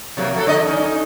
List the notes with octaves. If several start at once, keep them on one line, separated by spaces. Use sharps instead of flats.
C3 F#3 A#3
F#3 A#3 A4
D3 D5 D#5
C#4 D#4